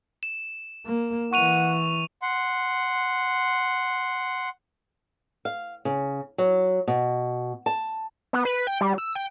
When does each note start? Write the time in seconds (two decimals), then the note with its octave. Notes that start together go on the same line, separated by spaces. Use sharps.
0.23 E7
0.86 A#3
1.33 E3 F#5 C#6 D#7 F7
2.22 F#5 C6
5.45 F5
5.85 C#3
6.38 F#3
6.87 B2
7.66 A5
8.33 B3
8.45 B4
8.67 G5
8.81 G3
8.98 E6
9.15 G5